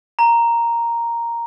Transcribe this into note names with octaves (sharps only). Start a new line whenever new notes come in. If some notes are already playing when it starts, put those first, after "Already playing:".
A#5